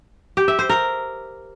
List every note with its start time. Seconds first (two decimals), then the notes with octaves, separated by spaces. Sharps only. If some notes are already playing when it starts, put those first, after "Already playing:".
0.37 G4
0.48 E5
0.59 C5
0.69 A#4